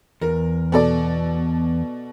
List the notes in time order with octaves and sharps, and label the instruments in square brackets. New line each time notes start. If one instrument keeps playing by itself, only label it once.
[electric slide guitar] E2 [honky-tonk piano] A#4
[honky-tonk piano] B2 A4 D5